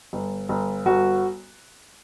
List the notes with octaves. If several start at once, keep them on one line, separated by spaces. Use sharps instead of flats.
G1
G1
G1 F#4